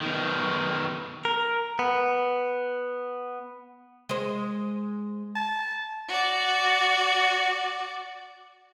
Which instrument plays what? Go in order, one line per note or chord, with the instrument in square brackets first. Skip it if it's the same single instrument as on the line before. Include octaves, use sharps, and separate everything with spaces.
[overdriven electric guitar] B2 D#3
[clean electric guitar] A#4
B3
[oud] G#3 C5
[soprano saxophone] A5
[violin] F#4 D5